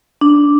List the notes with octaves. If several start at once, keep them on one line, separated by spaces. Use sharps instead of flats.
D4